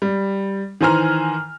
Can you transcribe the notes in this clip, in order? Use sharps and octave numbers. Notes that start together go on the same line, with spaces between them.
G3
D#3 E3 C5 G#5 A#5 F6